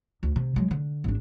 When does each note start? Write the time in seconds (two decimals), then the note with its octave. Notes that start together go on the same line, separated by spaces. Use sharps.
0.23 D2
0.36 C3
0.56 F#3 G#3
0.71 D3
1.04 G#1 D4